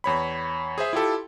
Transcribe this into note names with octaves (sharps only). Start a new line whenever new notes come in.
E2 C#5 B5
G#4 C5 E5
E4 F4 G4 A4